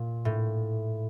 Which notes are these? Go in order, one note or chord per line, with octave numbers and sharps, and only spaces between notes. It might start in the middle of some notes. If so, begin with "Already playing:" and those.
Already playing: A#2
A2